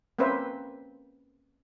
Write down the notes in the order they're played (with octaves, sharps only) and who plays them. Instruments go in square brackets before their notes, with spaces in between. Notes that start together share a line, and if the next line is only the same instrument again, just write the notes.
[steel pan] A#3 C4 C#4 B4 C5 E5